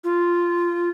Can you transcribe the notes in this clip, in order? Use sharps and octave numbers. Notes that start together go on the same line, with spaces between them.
F4